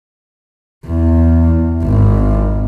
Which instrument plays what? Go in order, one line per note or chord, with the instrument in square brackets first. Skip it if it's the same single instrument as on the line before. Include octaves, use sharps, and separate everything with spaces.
[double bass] E2
G#1